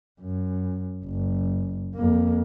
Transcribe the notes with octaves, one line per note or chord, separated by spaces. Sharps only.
F#2
F#1
F2 A#3